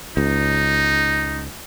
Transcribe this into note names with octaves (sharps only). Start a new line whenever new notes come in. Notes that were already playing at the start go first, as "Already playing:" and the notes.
C#2 D#4